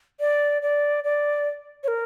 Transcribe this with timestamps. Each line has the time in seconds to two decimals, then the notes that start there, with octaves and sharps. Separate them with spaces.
0.20 D5
0.62 D5
1.04 D5
1.83 C#5
1.88 A#4